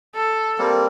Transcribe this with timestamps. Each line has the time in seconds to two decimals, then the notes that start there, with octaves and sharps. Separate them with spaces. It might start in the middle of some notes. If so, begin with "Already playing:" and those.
0.15 A4
0.58 G3 A#3 C4